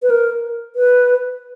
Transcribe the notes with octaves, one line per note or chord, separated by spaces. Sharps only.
B4
A#4
B4